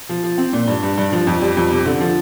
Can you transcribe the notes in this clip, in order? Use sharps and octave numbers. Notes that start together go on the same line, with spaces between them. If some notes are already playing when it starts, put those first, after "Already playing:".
F3
F3
C4
A#2
G2
G2
G2
F3
F2
G3
F2
C3
D3
F3